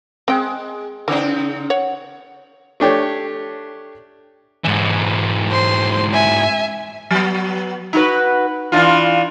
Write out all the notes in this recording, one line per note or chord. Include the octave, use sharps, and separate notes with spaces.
G#3 C4 G5
C#3 E3 C4 D#4
C#5 F#5
A3 D4 G4 C#5
G#2 E3
C5 C6
E5 G#5
F#3 B3
D#4 F#4 B4
E3 D4 F4